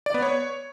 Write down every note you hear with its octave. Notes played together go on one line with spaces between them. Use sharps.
D5
B3
C#5